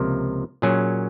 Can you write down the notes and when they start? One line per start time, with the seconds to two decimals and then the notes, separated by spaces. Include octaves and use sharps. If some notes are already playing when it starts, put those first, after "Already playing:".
Already playing: C#2 C3 F3 A#3
0.62 A#2 F#3 C#4 G#4